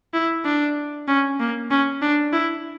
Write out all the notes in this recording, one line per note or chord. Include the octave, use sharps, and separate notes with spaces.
E4
D4
C#4
A#3
C#4
D4
E4